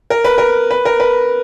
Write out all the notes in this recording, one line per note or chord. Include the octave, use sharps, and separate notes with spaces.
A#4
B4
A#4
B4
A#4
B4